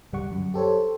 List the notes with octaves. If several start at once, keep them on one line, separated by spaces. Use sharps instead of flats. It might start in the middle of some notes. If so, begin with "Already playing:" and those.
D2 G2 G3 F#5 C#6
F#2
G4 A4 C5 C#5